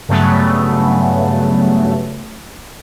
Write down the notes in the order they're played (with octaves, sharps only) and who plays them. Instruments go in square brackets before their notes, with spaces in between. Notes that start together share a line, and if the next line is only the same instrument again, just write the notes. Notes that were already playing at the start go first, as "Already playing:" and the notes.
[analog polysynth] G2 C#3 F#3 A3 B3